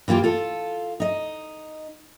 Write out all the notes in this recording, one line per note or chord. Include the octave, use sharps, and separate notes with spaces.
E3 A#3 F4 G4
F4 A4
D#4 D#5